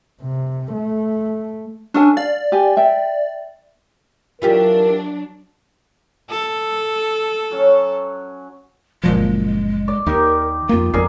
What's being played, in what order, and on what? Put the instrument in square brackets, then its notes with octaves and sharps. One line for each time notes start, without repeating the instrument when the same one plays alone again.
[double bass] C3
A3
[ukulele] C#4 A4 G#5 [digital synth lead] D4
[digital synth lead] D5 [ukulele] F5
[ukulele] G4 G#5
E5 G5
[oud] E3 F4 G4 [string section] F#3 D4 [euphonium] A#4
[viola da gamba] A4
[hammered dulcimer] F#3 C#4 F#4
[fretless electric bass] F#1 A#2 F3 [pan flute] G#3
[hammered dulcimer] D5
[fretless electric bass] D#2 [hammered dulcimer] D#4 G4 [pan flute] A#4
[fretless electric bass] F2 A#3 [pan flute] F4
[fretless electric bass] G#1 F2 C4 [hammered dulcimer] G#4 A#4 D5